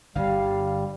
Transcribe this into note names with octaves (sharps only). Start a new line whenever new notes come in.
G1 D3 G3 F5